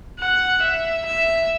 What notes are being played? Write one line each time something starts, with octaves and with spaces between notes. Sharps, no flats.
F#5
E5
E5